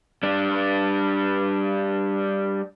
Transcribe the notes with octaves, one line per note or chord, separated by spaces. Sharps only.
G3 D4